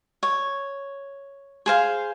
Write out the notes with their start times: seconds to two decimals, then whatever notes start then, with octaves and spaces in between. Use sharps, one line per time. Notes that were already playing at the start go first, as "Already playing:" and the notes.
0.23 C#5
1.66 G#4 C5 F5